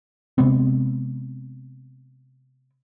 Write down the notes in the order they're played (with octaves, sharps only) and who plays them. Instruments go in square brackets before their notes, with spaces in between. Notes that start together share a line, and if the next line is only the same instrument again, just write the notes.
[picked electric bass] C3 G#3 B3 C4